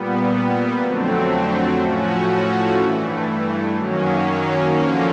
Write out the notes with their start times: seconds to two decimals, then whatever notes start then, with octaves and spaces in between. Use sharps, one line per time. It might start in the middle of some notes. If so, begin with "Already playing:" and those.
Already playing: A#2 G3 B3
0.82 F2 D3 F#3 A3 C4
1.80 A2 F3 A3 C#4 F#4
2.78 G2 E3 A3
3.76 F#2 D#3 F#3 A#3 C#4
4.74 D3 F3 A#3 C#4